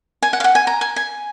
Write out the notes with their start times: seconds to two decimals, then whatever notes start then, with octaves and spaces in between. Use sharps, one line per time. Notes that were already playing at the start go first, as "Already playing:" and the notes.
0.22 G#5
0.33 F#5
0.40 F5
0.44 F#5
0.55 G#5
0.67 A#5
0.81 G#5
0.96 G#5